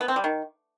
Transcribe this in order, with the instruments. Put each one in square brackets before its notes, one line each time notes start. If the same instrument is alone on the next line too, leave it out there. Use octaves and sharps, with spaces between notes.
[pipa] B3
C4
G3
D#3